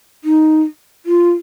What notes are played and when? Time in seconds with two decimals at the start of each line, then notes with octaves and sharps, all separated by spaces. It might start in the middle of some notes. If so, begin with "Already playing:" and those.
0.24 D#4
1.06 F4